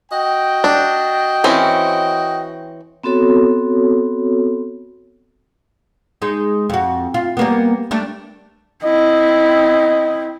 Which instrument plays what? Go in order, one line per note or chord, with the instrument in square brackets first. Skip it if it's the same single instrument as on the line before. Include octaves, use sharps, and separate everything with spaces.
[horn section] F#4 D#5 G5
[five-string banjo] D4
E3 C4 C#4
[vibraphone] B3 C4 F#4 A4 C#5
[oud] G#3 D#4
F2 F#4
F4
G3 A#3 B3
G3 A3 D4
[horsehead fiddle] C4 E4 [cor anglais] D#5